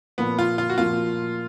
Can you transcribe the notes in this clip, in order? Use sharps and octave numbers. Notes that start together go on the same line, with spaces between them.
A#2 F3 A#3 B3
F4
F4
F#4
A#2 F3 A#3 F4